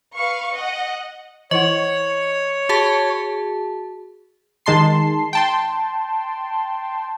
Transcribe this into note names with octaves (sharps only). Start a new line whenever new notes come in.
B4 F5 C#6
D#5 F#5
E3 E4 C#5 D#5 F#5
F#4 G#4 A5
D#3 G#3 A5 C6 C7
G5 A5 C6